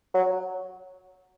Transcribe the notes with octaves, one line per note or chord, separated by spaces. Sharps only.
F#3